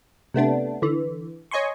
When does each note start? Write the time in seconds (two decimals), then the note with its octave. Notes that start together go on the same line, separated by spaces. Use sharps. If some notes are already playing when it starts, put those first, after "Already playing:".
0.34 C3 A3 B3 D4
0.82 D3 E3
1.51 C#5 D#5 G#5 C6 C#6